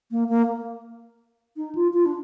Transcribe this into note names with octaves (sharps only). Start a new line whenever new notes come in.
A#3
A#3
D#4
F4
F4
D4